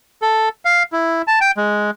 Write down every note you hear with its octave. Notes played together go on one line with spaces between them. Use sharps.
A4
F5
E4
A5
G5
G#3